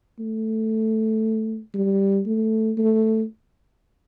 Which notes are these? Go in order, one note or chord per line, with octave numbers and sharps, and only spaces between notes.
A3
G3
A3
A3